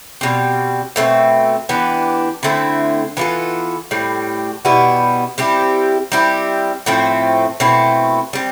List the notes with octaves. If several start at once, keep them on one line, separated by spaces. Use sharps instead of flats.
B2 G3 C4
B2 A3 C4
E3 B3 D4 G4
D3 A3 C4 E4
E3 B3 F4 A4
A2 G3 C4
B2 G3 B3 E4
G3 C4 E4 G4
G3 C4 E4 G4
A2 F3 A3 C4
B2 A3 C4 E4
G3 C4